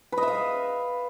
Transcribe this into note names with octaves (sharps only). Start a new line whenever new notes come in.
B4
D#5
E5
F5